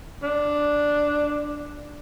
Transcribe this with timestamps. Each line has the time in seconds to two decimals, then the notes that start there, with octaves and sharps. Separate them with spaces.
0.23 D4